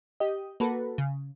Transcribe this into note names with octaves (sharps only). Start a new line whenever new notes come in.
G4 D#5
A#3 F#4 A4 B4
C#3